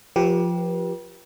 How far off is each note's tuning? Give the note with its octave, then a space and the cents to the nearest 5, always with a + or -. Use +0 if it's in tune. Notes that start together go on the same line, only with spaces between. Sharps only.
F3 +0 G4 +0 B4 -40